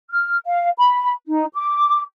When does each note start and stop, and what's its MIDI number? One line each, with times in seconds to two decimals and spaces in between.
0.10 0.36 89
0.46 0.69 77
0.78 1.11 83
1.27 1.45 63
1.54 2.00 86